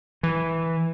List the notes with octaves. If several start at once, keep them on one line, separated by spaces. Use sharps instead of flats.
E3